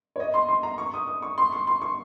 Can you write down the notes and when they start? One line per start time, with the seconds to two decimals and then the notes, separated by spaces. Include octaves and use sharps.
0.16 C#5
0.20 D#5
0.34 C6
0.49 C6
0.63 A#5
0.78 C#6
0.94 D#6
1.08 D#6
1.22 C#6
1.38 C6
1.52 C#6
1.67 C6
1.82 C#6